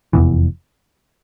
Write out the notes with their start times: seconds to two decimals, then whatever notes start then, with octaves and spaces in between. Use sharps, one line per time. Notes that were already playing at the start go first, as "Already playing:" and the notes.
0.13 F1 E2 C3 E3